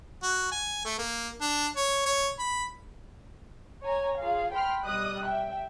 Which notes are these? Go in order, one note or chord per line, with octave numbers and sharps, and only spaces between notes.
F#4
G#5
A3
A#3
D4
C#5
C#5
B5
C#5 G#5 A#5
F4 G#4 F5
G5 B5 C6 F6
B1 G3 D#5 D#6 F#6
E5 G5